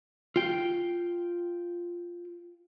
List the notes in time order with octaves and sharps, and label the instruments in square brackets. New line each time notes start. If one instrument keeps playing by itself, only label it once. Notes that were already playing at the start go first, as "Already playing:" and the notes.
[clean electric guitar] F4 G5